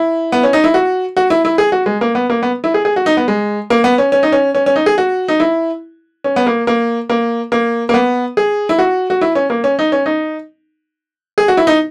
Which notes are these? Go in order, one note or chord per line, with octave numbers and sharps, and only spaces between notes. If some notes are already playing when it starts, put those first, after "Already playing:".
Already playing: E4
B3
C#4
D#4
E4
F#4
F#4
E4
E4
G#4
F#4
G#3
A#3
B3
A#3
B3
E4
G#4
G#4
F#4
D#4
B3
G#3
A#3
B3
C#4
C#4
D#4
C#4
C#4
C#4
D#4
G#4
F#4
D#4
E4
C#4
B3
A#3
A#3
A#3
A#3
A#3
B3
G#4
E4
F#4
F#4
E4
C#4
A#3
C#4
D#4
C#4
D#4
G#4
F#4
E4
D#4